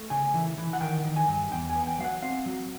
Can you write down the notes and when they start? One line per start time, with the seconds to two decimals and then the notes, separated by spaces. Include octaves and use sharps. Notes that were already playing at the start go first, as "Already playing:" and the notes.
Already playing: A3
0.10 C#3 G#5
0.34 E3
0.58 E3
0.73 F#5
0.81 D#3 G5
1.04 D#3
1.16 G#5
1.28 G2
1.51 E2 G5
1.70 G#5
1.75 B3
1.87 G5
1.99 F#3 F5
2.04 F#5
2.22 C4 F5
2.46 F#3